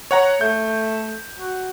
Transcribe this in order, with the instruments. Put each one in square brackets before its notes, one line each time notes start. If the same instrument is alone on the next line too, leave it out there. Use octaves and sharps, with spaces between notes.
[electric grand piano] C#5 F#5 A#5
[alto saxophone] A3 [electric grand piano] G6
[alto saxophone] F#4